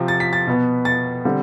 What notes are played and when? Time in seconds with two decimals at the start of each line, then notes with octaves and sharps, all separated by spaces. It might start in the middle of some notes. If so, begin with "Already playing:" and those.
Already playing: C3 F3 C4
0.08 A6
0.20 B6
0.33 A6
0.47 B2 B3
0.85 A6
1.25 D3 G3 C4